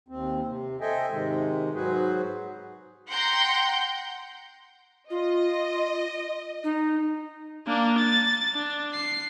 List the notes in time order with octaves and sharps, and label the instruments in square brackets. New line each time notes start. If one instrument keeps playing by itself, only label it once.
[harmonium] D#2 C4
C3
A4 C5 D#5 E5 G5 G#5
G#2 C3 D#3 G#3
G#2 F#3 F#4 G#4 B4 C5
[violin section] F#5 G5 A#5 C6 G6
[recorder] F4 [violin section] D#5
[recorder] D#4
[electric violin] A#3 D4
A6
D4
C7